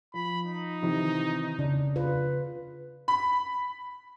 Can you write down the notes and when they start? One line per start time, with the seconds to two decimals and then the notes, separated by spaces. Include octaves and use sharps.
0.14 F3 B5
0.46 D#4
0.82 C3 D#3 E3
1.59 C#3 D4
1.96 F4 B4
3.08 B5